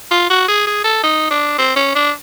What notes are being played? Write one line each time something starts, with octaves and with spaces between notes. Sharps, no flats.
F4
F#4
G#4
G#4
A4
D#4
D4
C4
C#4
D4